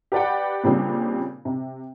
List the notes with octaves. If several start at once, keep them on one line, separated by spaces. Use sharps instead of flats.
G4 B4 D5 F#5 G5
A#2 C#3 G3 C4 D4
C3